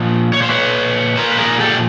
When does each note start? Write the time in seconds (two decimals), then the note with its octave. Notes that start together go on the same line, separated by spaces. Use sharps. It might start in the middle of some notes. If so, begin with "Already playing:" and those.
Already playing: A#2 F3 D#5
0.33 F3 C#5
0.37 A#2
0.42 C5
0.50 B4 C#5
1.17 A#2 F3 A#4 C5
1.30 B4
1.39 G#4 A#4
1.60 G4 A4